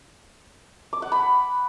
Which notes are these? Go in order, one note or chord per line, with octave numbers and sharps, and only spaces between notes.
D6
F#5
B5